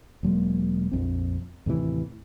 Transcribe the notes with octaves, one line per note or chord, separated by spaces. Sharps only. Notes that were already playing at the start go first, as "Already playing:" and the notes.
E1 F#3 G#3 A#3
A#1 F2 C4
D#2 A2 C3 E3